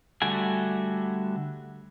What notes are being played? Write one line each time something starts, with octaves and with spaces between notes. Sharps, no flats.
D3 G3 A3 F#4 G#5